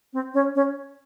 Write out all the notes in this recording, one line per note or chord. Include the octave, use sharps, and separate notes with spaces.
C4
C#4
C#4